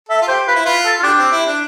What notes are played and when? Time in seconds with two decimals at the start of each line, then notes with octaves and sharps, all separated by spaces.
0.09 A4 E5
0.22 F4
0.28 G4 C5
0.47 F4 B4
0.56 E4
0.65 F4 B4
0.85 A4
1.00 F4
1.03 D4 G4
1.18 C4
1.32 E4
1.47 D4